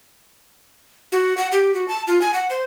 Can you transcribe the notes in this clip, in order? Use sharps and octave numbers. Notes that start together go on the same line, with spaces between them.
F#4
F#5
G4
F#4
A5
F4
G#5
F#5
C5